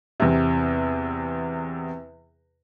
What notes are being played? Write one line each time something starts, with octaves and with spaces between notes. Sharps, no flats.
E2 C3